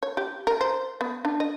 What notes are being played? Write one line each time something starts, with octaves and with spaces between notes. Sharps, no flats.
C#5
G4
A#4
C5
B3
D4
D#5